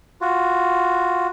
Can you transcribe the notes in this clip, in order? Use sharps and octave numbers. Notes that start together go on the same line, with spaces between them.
F4 F#4